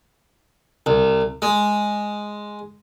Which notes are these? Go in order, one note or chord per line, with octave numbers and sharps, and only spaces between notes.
C2
G#3